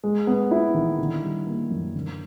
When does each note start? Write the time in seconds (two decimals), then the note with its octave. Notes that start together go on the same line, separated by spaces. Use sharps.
0.04 G#3
0.27 B3
0.51 E4
0.74 D#3
0.99 D3
1.23 G3
1.46 A#3
1.71 F#2
1.95 D3